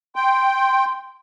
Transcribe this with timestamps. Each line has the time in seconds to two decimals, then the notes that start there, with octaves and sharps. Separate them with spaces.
0.16 G5 C6